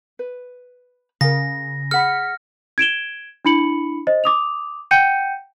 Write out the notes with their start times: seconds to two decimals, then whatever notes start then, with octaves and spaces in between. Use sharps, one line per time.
0.19 B4
1.21 C#3 A#4 F5 A#6
1.91 G#4 F#5 B5 F6 B6 C#7
2.78 G#6 D7 E7 G7
3.45 D4 E4 B5 C#7 F#7
4.07 C5 D#5
4.24 D6 D#6 F7
4.91 F#5 G5 G6 C#7 D#7